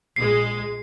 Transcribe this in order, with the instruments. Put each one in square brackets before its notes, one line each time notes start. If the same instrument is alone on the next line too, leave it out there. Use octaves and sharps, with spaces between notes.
[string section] A#1 G#3 [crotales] C7